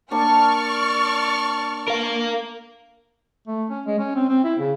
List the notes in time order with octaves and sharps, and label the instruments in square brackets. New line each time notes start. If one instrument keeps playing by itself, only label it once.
[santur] A#3 D4 A5 [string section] D5 C#6 F6
[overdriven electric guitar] A#4 F5
[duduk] A3
C#4
G#3
C#4
C4
C4
E4
C#3